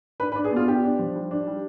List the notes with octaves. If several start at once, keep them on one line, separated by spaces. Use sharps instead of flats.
D4 B4
B4
D4
G#4
B3 F4
D4 G4
D4
F3
G3
D4
G3